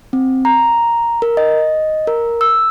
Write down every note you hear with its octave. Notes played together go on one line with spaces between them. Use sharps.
C4
A#5
A#4
D#5
A#4
E6